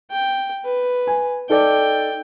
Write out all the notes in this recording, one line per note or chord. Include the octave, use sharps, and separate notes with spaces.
G5
B4
G#5
D#4 A4 D5 G5